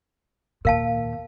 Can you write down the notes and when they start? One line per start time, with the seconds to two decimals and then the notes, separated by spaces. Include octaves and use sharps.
0.65 D#2 A#2 A#4 F5 A5